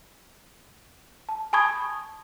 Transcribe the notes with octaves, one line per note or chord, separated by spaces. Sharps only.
A5
G#5 A5 B5 C#6 D#6 G#6